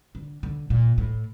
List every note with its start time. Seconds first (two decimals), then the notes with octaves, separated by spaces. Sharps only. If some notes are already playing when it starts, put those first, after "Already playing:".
0.15 D3
0.43 D3
0.70 A#2
0.98 A2